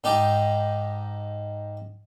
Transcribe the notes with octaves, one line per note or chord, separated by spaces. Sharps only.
G#2 D#4 G4 A5